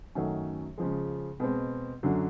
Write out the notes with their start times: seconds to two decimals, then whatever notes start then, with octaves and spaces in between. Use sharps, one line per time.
0.15 F#2 D#3 F#3 A3 C#4
0.78 C#3 F3 G#3
1.40 B2 G#3 C4
2.03 F#2 D3 F#3